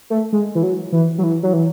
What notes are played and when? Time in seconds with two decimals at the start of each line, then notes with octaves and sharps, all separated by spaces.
0.10 A3
0.33 G#3
0.55 E3
0.63 F#3
0.92 E3
1.18 F#3
1.23 E3
1.43 F#3
1.53 E3